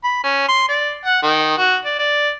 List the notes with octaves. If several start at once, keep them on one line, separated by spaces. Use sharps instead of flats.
B5
C#4
C6
D5
F#5
D#3
F#4
D5
D5